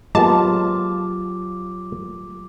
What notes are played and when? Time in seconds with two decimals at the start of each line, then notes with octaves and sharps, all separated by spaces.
0.15 F#3 G#3 A#3 B3 F4 G4 A5 D6